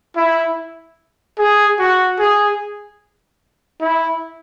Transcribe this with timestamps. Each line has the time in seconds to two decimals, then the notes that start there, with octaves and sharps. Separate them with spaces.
0.17 E4
1.38 G#4
1.79 F#4
2.19 G#4
3.81 E4